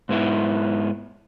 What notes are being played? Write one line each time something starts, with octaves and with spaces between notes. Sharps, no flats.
G#2 B3 E4